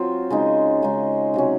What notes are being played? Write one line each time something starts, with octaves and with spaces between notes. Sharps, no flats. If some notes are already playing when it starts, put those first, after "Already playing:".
Already playing: F#3 C4 F4
C#3 G#3 D#4
C#3 G#3 D#4
C3 F#3 C#4